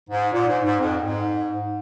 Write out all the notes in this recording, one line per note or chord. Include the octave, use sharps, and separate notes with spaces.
G#2
A#2
G#2
G#2
F2
G#2